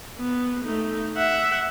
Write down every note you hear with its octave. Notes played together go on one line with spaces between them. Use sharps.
B3
A3 D#4
E5 F#5